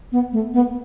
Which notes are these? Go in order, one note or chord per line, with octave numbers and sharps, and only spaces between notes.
B3
A3
B3